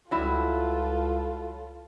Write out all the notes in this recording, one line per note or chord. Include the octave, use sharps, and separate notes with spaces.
C#2 F#3 G3 E4 F4 A4